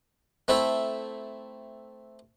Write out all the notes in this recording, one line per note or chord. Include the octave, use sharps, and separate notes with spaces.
A3 C4 E4 A4 E5